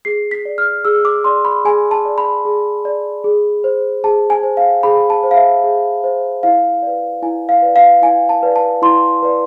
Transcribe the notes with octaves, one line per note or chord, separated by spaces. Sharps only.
G#4 C7
B6
D5
F6
G#4 E6
D6
D5 C6
B5
G#4 G#5
A5
D5
B5
G#4
D5
G#4
C5
G#4 A5
G#5
C5
F5
G#4 B5
A5
C5
F5
E5
G#4
C5
E4 F5
B4 D5
E4 G#5
F5
B4 D5
F5
E4 G#5
A5
B4 D5
A5
E4 C6
B4 D5